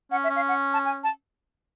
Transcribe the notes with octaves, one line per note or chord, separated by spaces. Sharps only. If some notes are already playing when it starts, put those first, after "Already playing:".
C#4 F#5
E5
C#4
F5
F#5
A5
G#5
A5